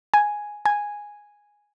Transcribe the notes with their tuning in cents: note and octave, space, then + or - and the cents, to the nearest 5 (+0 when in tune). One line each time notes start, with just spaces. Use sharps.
G#5 +0
G#5 -5